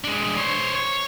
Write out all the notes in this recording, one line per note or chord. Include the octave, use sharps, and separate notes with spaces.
G#3 D4
C5 C#5
C#5